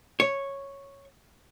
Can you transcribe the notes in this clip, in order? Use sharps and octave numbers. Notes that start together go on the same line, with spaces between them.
C#5